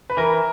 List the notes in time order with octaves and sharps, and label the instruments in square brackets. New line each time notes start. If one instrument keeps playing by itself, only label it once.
[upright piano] B4
[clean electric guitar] E3 [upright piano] A#4